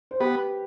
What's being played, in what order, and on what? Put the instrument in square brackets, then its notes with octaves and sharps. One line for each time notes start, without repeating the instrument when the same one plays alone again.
[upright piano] C5
[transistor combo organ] B3 [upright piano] G4 B4